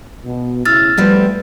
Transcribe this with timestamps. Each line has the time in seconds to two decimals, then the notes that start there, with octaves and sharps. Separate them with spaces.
0.25 B2
0.65 D2 C#3 E4 E6 F6 A6
0.97 F3 G3 A3 B3 B4